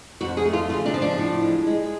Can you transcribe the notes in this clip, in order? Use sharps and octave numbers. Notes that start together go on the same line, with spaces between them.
F2 F#4
G#4
A3
F4
C#3 F4
D4
F3
D4
A2
G#3
G#3